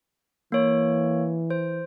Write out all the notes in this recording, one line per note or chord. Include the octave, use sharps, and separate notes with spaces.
E3 A#3 C#5
C5